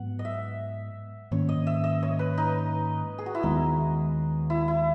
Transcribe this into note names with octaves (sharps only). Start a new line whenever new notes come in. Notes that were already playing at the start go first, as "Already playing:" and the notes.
Already playing: G#2 F#3 B3 F#5
D#5
E5
G#2 D#3 A#3 C#4 C#5
D#5
E5
D#5
C#5
B4
D#4
G#4
F#4
E4
D#2 D#3 G#3 B3 D#4
E4
E4